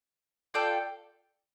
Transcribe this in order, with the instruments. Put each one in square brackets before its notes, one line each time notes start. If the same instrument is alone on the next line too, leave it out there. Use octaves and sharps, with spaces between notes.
[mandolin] F4 A4 D5 G5